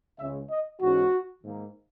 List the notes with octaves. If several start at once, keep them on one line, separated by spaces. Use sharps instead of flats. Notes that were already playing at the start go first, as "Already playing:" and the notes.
C#2 C#3 G#3 C#4 E5
D#5
G#2 E3 G#3 C#4 F#4
G#2 D#3 A#3